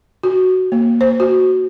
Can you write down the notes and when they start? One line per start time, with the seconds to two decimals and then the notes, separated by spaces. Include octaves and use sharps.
0.23 F#4
0.72 A#3
1.01 C5
1.20 F#4